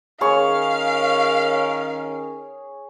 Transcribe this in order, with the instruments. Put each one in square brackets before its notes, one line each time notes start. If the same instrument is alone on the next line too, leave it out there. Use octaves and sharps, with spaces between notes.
[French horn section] D#3 C#4 A#4 [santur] G#4 C#5 C#6 [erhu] F5